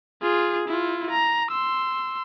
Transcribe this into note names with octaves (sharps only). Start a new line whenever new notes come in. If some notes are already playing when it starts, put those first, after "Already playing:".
F4 G#4
E4 F4
A#5
C6 E6